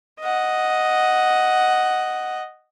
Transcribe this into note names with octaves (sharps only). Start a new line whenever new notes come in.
D#5 F#5